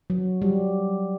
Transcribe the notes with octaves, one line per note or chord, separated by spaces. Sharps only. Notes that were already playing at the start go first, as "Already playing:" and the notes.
F#3
G3